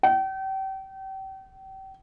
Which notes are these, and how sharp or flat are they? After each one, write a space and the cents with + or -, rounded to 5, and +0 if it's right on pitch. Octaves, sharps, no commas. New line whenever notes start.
G5 -35